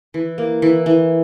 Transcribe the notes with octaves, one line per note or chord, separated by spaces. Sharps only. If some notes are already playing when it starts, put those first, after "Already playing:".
E3
A#3
E3
E3